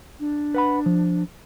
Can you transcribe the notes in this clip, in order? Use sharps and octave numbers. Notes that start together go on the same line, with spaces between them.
D4
B4 F#5 B5
F3